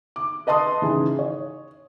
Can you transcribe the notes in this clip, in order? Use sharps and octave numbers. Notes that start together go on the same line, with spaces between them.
D6
B4 D#5 A5 C6 D#6
G#2 C#3 E3
C#5